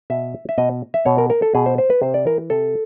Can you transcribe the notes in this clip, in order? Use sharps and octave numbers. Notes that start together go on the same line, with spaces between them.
B2 E5
E5
B2 D#5
E5
B2 C#5
A#4
A#4
A4
B2 G#4
C5
C5
B4
C3 C5
D5
E3 A#4
C3 A4